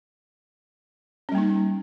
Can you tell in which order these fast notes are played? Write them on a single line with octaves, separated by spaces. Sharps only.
C#4 G3 A#3 D#4